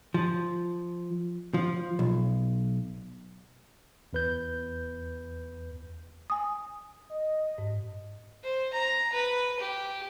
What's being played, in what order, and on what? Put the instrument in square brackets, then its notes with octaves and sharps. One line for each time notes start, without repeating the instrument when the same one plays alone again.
[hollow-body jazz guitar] F3
F3
B1
[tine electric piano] E2 B4 G6
[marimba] G#5 D#6
[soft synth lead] D#5
[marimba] G#2
[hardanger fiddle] C5
A#5
B4
G4